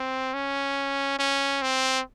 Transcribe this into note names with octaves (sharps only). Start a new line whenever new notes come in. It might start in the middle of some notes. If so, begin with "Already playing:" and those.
Already playing: C4
C#4
C#4
C4